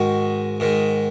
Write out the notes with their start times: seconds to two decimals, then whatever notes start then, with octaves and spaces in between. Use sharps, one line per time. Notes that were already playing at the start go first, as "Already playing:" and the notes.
Already playing: G#2 D#3 F#4
0.60 G#2 D#3